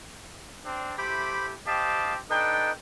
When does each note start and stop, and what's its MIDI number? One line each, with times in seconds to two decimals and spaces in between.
0.65 0.96 60
0.65 0.96 62
0.98 1.53 57
0.98 1.53 64
0.98 1.53 67
0.98 1.47 72
0.98 1.47 83
0.98 1.47 86
1.67 2.18 60
1.67 2.18 67
1.67 2.14 75
1.67 2.14 77
1.67 2.18 81
2.30 2.71 62
2.30 2.72 63
2.30 2.71 69
2.30 2.72 71
2.30 2.72 75
2.30 2.71 79